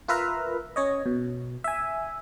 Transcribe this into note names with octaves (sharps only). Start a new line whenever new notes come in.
F4 A#4 B4 E5 F5 A#5
C#4 C#5 D#5
B2
E5 G#5